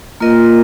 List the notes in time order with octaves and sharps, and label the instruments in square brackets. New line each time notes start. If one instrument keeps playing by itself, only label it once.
[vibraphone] A#3 F4 A#4 D#5